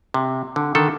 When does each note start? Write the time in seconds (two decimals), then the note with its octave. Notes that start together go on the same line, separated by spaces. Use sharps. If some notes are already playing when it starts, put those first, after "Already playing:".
0.14 C3
0.56 D3
0.75 D3 D#3 A4